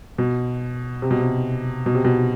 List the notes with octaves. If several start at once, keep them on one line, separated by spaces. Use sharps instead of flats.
B2
C3
B2
C3
B2
C3
B2